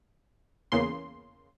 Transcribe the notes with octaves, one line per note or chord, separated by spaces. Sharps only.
E2 C#3 A#3 C6